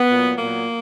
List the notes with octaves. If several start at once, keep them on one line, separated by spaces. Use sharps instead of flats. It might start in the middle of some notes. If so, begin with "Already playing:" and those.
Already playing: B3
A#2 F#3
A#2 F#3 A#3